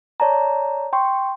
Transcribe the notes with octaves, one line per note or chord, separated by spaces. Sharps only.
C#5 D5 A5 A#5
G5 C6 C#6